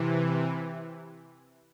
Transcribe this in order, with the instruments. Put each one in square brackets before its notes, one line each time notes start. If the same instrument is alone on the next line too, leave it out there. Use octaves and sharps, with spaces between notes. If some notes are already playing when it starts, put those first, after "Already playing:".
Already playing: [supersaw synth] C3 E3